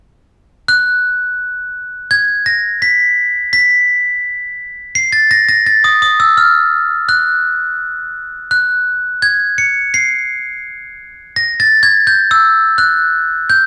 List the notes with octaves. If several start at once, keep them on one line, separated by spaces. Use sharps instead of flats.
F#6
G#6
A#6
B6
B6
C7
A6
A#6
A#6
A6
D#6
D#6
E6
F6
F#6
F#6
G#6
C#7
C7
A#6
A6
G#6
G6
E6
F#6
G6